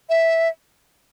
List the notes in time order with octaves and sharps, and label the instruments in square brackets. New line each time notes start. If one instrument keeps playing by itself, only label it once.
[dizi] E5